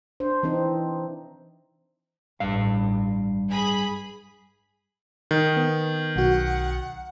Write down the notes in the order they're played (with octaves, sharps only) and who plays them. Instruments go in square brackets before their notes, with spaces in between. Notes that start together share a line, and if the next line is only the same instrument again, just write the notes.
[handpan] D4 C5
E3 C4 D#4 C5
[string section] A1 [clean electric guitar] G2 F5
[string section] G#4 B5
[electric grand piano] D#3
[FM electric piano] B3
[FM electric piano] B1 F#4 [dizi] F#5